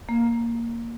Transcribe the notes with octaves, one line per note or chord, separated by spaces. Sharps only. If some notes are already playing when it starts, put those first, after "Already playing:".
A#3